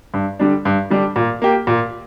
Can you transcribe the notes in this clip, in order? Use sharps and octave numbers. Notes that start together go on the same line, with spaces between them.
G2
D3 G3 D4
G2
D3 G3 D4
A#2
A#3 G4
A#2